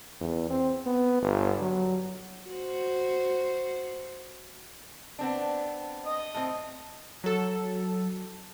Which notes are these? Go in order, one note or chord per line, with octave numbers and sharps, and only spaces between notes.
E2
C4
B3
G1
F#3
F#4 C5
B3 C4 D4
D#5
A2 C4
F#3 A4